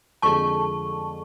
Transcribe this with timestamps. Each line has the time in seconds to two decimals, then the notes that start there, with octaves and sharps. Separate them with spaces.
0.22 F2 D3 G#3 A5 C#6